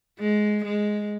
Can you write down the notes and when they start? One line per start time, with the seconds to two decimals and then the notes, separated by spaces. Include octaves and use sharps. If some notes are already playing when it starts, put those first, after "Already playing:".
0.19 G#3
0.65 G#3